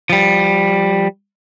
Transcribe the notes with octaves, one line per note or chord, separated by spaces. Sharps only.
F3 G3